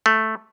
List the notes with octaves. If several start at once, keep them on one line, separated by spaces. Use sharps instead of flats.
A3